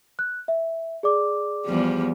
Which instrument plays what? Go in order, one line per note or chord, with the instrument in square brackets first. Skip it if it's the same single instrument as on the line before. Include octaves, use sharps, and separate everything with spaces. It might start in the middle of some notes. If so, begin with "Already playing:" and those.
[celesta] F#6
E5
G#4 D5 D6
[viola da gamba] E2 F3 G3